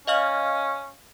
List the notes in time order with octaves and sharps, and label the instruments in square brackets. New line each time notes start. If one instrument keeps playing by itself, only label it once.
[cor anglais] C#4 [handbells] D#5 F5 F6